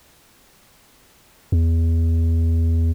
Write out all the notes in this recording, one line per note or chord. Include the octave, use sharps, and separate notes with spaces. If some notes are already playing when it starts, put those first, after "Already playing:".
E2